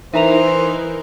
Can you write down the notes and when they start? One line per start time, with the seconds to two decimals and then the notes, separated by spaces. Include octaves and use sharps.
0.14 E3 D#4 E4 A#4 C5 E5 A#5 F7